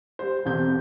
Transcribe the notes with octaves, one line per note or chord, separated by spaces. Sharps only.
G3 C5
E1 F2 C3 G6